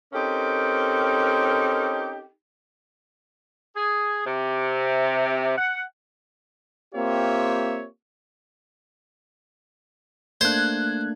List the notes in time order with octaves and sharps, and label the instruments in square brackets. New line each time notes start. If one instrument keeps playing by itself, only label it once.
[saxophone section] C4 C#4 D#4 G4 A4 A#4
G#4
C3
F#5
[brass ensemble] A#3 C4 F4 G4 C#5 E5
[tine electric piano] A3 A#3 D4 [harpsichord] C5 [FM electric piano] F#6 G#6